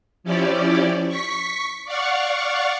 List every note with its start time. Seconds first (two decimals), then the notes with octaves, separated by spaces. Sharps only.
0.24 F3 C#4 E4 G4 D5
1.08 C#6 B6
1.85 D5 F5 F#5 C#6